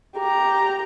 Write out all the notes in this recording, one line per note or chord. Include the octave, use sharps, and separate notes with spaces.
G4 A#5